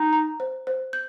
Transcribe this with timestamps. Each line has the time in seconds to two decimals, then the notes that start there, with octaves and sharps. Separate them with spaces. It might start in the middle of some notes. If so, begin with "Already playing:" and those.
Already playing: D#4 G5
0.13 A#5
0.40 C5
0.67 C5
0.93 G6